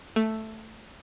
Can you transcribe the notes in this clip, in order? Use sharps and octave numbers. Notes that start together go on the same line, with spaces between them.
A3